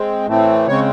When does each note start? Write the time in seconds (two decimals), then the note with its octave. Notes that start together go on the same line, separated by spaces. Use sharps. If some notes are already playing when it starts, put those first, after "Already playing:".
Already playing: G#3 C4
0.27 A2 E3 A3 C4
0.67 C#3 G#3 C4 C#5